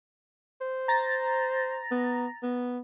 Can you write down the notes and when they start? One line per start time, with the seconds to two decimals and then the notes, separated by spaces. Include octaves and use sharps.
0.61 C5
0.88 A#5 A6 A#6
1.91 B3
2.43 B3